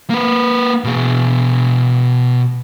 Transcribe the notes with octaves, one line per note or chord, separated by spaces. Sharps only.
A#3 B4
B2 G#4